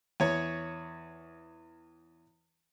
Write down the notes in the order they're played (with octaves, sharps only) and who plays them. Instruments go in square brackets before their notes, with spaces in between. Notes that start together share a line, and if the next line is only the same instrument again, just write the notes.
[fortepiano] E2 C#5